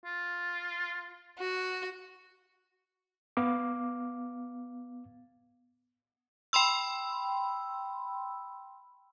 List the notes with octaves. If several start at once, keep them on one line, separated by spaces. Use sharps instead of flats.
F4
F#4
B3 F5 D6
G5 B5 C6 E6